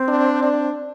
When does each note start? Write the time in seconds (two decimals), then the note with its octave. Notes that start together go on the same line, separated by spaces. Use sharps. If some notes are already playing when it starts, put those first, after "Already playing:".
Already playing: C4
0.08 D4
0.43 D4